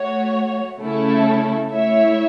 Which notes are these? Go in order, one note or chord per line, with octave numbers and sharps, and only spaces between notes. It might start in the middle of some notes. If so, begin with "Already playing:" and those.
Already playing: A3 F#4 C#5
C#3 A3 C#4 E4 A4
A3 E4 C#5 E5